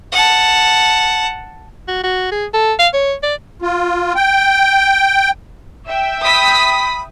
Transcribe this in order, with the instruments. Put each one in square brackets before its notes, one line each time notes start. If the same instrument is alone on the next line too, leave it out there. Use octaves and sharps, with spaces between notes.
[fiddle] F#5 A5
[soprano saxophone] F#4
F#4
G#4
A4
F5
C#5
D5
[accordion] F4
G5
[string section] E5 G5
[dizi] B5 [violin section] D#6 B6